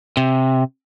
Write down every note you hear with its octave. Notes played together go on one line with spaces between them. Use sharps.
C3